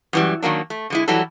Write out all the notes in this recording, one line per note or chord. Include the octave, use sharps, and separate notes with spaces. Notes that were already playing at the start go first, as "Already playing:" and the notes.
F#2 E3 G3
D#3 F#3 A#3 D4
A3
D3 G#3 E4
E3 F#3 G3 E4 A4